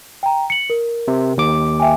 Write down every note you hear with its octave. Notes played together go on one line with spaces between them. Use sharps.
G5 A#5
C#7 F#7
A#4
C3
D#2 D6
E5 G5 G#5